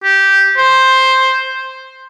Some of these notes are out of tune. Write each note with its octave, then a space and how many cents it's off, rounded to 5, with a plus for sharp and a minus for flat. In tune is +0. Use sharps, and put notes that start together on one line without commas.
G4 -10
C5 +5